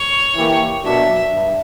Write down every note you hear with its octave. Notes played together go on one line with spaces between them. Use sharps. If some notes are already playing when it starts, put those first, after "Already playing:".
Already playing: C#5
E3 A#3 E4 G4
B2 F#3 A#3 D4 E5
G2